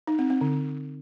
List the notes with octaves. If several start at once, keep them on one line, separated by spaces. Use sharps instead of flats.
D#4
C4
C4
D3